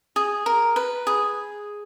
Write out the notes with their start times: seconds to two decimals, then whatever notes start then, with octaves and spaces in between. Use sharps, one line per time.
0.16 G#4
0.46 A#4
0.76 B4
1.07 G#4